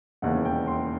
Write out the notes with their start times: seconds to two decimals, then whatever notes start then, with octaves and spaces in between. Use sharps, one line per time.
0.22 E1 D#2 C#3 E3 F#5
0.45 G5
0.67 C6